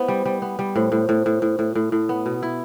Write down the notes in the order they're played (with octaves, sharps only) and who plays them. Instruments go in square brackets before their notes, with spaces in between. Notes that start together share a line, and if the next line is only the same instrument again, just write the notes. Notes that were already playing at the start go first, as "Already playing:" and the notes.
Already playing: [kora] B3 E4 [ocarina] C5
[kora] G3
G3
B3
G3
[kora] A2 [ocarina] C5
[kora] A2
A2
A2
A2
A2
A2
A2
B3
B2
E4